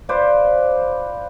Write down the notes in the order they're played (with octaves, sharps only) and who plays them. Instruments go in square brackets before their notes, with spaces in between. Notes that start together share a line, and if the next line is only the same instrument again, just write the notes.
[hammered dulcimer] F4 B4 C5 D5